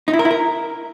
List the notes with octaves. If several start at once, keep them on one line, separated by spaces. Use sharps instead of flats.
D#4
E4
A#4
E4
A#4